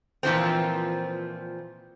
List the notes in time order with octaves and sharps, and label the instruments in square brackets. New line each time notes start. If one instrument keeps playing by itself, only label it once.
[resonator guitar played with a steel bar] A#2 E3 F3 C4